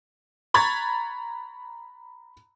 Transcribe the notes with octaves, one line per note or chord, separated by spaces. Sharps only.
A#5 B5 C#6 G#6 A6